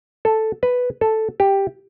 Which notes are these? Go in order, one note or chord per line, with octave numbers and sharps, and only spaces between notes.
A4
B4
A4
G4